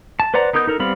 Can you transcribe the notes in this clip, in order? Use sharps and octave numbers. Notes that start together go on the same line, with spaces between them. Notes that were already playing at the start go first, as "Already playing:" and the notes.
A5
B4 C5 D5 F#5 A#5
B3 D#4 A#4 D#6 G6
D#4 A4 A#4
G3 B3 C4 F5 B5